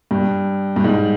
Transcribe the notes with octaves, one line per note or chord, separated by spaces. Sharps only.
G2
G2
G#2